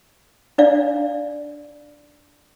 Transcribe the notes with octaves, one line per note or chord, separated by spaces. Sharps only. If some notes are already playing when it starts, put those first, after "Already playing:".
D4 D5 F5